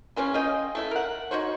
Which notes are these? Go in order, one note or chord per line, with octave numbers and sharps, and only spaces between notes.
C#3 E3 C4 C#4
C#4 F4 D#5 G5
A3 E4 E5
A#4 F#5
D#4 F#4 C5 C#5